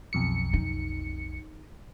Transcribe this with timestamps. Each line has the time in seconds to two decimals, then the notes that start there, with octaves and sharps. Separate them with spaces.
0.13 B1 F2 C#7
0.53 D#4